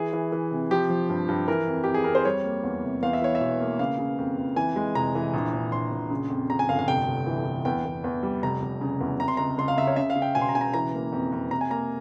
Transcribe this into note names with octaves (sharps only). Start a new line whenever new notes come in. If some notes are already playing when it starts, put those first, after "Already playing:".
Already playing: E3 G#4
E3
E3
C3
F3 G4
F3
G2
G2
E3 A#4
F2
F2 G4
G#4
F2 A#4
C5
G3 C#5
A#3
E2
C3
E2 F5
E5
E3 C#5
E5
E1
A#3
C#3 F5
C#3
F2
F2
E3 G#5
G#3
F1 A#5
E3
A#1
A#1
A#1 C6
A#1
C#3
F2
C#3 A#5
G#5
G1 F5
F5
F1 G5
F1
E3
E3
E2 G5
E2
E2
G3
F1 A#5
F1
C#3
E2
C3 A#5
C6
C#2 A#5
C#2 C6
F5
C#2 E5
C#5
C#3 E5
F5
C#3
G5
E1 G#5
C6
A#5
C#3 G#5
A#5
E3 A#5
A#3
F2
F2
C3 A#5
G#5
A#3 A#5